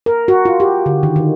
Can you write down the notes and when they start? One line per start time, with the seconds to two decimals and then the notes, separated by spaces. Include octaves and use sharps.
0.06 A#4
0.28 F#4
0.45 F4
0.60 G4
0.86 D3
1.03 D#3
1.16 D#3